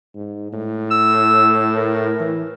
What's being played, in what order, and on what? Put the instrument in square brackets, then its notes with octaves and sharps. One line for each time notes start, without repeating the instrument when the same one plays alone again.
[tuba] G#2
A2
[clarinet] E6
A#4
[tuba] E3